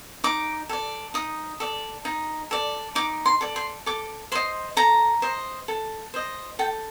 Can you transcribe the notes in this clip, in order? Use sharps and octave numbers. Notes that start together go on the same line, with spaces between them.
D#4 D6
A4 D5
D#4 D#6
A4 D5
D#4
A4 D5
D#4 D6
C6
A4 D5
C6
A4 D6
C5 D#5 C6
A4 A#5
C5 D#5
A4
C5 D#5
A4 G5